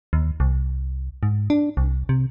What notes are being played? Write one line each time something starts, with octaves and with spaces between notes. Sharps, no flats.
D#2
C2
G#2
D4
C2
C3